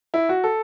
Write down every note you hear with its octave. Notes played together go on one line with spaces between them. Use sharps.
E4
F#4
A4